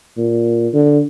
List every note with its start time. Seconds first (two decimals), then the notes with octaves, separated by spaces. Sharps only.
0.17 A#2
0.74 D3